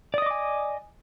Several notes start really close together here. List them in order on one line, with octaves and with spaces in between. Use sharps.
D5 D#6 D#5 D6 G#5